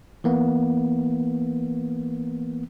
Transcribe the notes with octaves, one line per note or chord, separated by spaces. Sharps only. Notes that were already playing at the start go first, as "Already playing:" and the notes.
E3 A#3 B3